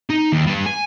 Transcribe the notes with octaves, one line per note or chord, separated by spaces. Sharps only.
D#4
D#2
G3 B4
G#5